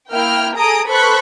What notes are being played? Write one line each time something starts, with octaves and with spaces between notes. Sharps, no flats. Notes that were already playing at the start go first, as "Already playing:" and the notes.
A#3 E4 G5 F6
G#4 A4 A#5 D#6 D7
A4 B4 C5 B5 C#6 F#6